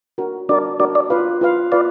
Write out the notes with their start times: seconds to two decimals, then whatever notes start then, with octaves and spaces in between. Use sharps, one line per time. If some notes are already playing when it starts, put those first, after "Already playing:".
0.18 D4 F#4 A#4
0.49 D4 F#4 A#4 D5
0.80 D4 F#4 A#4 D5
0.95 D5
1.10 F4 B4 F5
1.41 F4 B4 F5
1.72 F4 B4 D5 F5